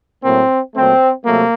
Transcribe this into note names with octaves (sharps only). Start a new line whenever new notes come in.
A2 F#3 A#3 C4
A#2 F#3 A3 C4
C3 F#3 A3 A#3